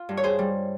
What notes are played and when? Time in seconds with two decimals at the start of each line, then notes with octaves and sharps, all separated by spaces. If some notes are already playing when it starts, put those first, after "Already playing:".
Already playing: F4
0.09 G2
0.17 C#5
0.24 G#4 C5
0.39 G3